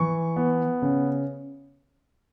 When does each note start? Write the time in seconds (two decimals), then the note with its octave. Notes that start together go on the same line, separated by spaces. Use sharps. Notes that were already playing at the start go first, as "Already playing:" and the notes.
Already playing: E3 C#6
0.36 B3
0.82 C#3